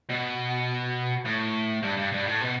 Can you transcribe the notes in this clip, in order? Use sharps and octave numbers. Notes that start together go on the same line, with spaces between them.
B2
A2
G2
G2
G2
A2
B2